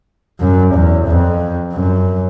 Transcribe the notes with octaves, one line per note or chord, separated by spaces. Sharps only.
F#2
E2
F2
F#2